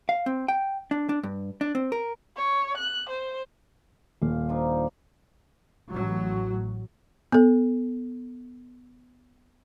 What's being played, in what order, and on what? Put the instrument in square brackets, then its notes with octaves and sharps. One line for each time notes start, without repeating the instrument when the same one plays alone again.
[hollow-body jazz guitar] F5
C4
G5
D4
D4
G2
D4
C4
A#4
[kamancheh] C#5
F#6
C5
[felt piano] D#1 [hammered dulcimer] F5
[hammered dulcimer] F3 D4 D#4
[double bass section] A1 F#3
[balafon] B3 A4